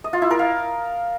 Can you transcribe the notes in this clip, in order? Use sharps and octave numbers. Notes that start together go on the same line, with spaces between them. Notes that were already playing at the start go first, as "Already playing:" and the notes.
D#5
F4
E4
A#4
F5